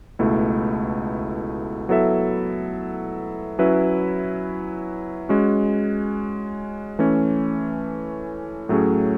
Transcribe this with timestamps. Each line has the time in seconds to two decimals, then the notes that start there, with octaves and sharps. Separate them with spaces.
0.19 C#2 B2 A3 E4
1.89 F#3 B3 E4 A4 E5
3.59 F#3 C#4 E4 B4 E5
5.29 G#3 C#4 F#4
6.99 E3 A3 C#4
8.69 A2 F#3 A3 C#4 G#4